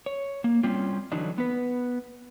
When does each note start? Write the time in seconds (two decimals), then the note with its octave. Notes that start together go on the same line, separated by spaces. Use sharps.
0.06 C#5
0.44 A#3
0.63 G3 C4 C#4 F4
1.12 D3 E3 F#3 D4 D#4
1.38 B3 B4